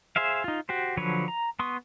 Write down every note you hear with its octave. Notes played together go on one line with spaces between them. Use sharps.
G#4 C5 E5 F5
D#4 F4
F#4 G4 C5
D3 F3 F#3 B4 C#5
A#5
B3 C6 C#6 D#6